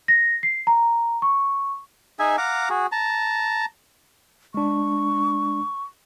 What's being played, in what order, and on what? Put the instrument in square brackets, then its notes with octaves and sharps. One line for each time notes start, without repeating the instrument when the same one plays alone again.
[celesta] A#6
C7
A#5
C#6
[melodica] D#4 G#4 E5 G#5
F5 F#5 A#5 D6
F#4 G#4
A5 A#5
[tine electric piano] G#3 D4 [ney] C#6